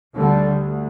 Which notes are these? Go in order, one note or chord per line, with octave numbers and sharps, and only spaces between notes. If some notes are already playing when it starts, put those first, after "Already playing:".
D2 D3 G3